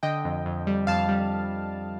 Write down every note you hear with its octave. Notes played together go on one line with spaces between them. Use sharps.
D3 D#5 G5
F2
F2
G3
F2 F5 A5
G3